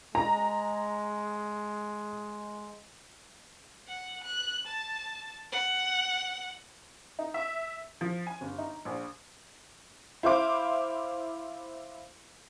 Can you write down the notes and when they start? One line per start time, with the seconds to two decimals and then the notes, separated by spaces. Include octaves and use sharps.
0.15 G#3 A#5
3.88 F#5
4.23 F#6
4.67 A5
5.52 F#5
7.19 D#4
7.34 E5
8.01 F3
8.27 G#5
8.41 G1
8.58 D#4
8.85 A#1
10.23 E4 C5 F5 D6